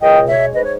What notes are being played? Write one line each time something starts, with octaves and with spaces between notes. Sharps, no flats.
C#2 D#5 G5
B2
C#5 E5
G#3
G#2 B4 D#5
C#5